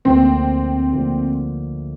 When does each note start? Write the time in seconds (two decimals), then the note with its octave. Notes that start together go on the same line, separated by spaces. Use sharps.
0.05 D2 D3 F3 A#3 C4
0.93 D2 D3 F3 A#3